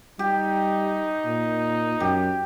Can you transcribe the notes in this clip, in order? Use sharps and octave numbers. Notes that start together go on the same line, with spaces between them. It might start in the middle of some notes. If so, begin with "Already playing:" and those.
G3 D#4 G4
A#2
F#2 G4